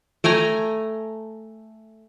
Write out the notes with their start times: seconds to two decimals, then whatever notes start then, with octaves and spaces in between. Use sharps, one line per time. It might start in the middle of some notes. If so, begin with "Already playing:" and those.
0.24 A3 G5 G#5 A#5